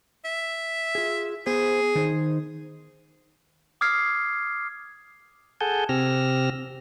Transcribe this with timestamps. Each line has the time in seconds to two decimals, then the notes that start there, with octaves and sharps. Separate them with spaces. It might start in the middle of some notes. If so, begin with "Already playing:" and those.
0.25 E5
0.95 F4 G#4
1.46 B3 G#4 C5
1.95 D#3 D#4 C5
3.81 D6 D#6 F6 G#6 C7
5.61 G#4 A4 F#5 G#5 A5 G6
5.89 C3 C4 G4 E6 F6 A#6